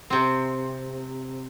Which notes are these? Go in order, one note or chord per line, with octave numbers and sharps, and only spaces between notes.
C3 C4